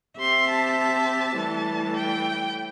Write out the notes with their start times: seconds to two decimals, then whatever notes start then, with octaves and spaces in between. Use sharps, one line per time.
0.19 C4 G4 E5 C6
0.49 A5
0.78 A5
1.38 A2 E3 G3
1.97 G5